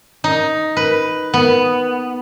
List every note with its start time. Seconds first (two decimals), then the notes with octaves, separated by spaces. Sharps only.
0.24 D#4
0.77 B4
1.34 B3